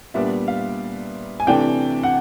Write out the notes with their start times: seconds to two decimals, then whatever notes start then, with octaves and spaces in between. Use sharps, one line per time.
0.14 A#2 G3 B3 D4 E5
0.48 F5
1.40 G#5
1.47 C3 E3 A3 D4 G5
2.03 F#5